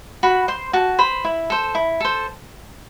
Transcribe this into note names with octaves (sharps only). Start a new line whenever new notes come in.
F#4 B5
C5 C6
F#4 A5
C5 B5
E4
A4 C5
E4
A4 C5